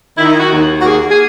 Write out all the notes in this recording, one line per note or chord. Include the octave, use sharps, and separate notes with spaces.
D#3 E4
D#4
E4
F#4
D#2
F#4
A#3 G#4
G#4